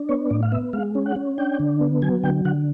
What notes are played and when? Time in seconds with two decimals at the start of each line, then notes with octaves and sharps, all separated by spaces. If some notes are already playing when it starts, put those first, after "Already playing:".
Already playing: D4
0.09 B3 C#5
0.30 A2 D5
0.43 F5
0.52 B3 E5
0.73 G#3 F5
0.95 C#4
1.06 F#5
1.16 C#4
1.38 D4 G5
1.59 D3
1.81 B3
2.02 F#3 G#5
2.23 D3 G5
2.45 D3 F#5